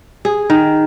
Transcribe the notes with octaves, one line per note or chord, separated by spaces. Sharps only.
G#4
D#3